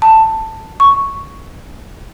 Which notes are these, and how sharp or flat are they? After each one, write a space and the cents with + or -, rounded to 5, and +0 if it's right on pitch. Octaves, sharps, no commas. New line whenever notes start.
A5 +10
C#6 +0